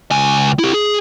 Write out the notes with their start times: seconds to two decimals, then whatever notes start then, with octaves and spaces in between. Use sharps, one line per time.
0.11 C#2 G#5
0.59 E4 G4
0.74 G#4